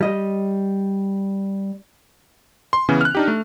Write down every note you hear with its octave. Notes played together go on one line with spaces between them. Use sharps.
G3 D#5
C6
C#3 E3 B3 C#4
F6 F#6
D4 D#4 G4
A3